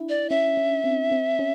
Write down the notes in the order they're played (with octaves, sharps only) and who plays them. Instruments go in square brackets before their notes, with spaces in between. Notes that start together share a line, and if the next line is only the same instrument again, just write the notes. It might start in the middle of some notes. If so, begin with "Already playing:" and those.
Already playing: [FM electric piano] D4 E4
[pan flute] D5
[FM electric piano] C#4 [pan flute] E5
[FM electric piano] C#4
C4
C4
C#4